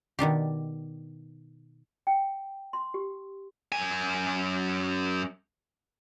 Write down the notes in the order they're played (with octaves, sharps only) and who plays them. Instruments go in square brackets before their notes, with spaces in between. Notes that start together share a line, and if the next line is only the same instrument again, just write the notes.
[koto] B2 D#3 D4 G4
[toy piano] G5
C6
G4
[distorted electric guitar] F#2 G#5